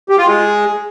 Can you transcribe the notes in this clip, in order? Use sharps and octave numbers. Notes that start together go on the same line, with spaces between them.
G4
F4
G#3